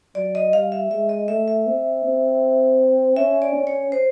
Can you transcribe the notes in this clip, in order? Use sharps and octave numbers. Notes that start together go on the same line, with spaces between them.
F#3 D5
D#5
G3 F5
E5
G#3 E5
D#5
A3 E5
E5
C4
C4
C#4 E5
D5
C#4
C#5
C5